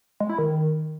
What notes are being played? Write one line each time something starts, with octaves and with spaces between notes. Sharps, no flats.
G#3
E4
D#3